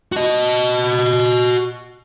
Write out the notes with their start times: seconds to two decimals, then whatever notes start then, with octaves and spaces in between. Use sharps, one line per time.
0.12 F#4 D#5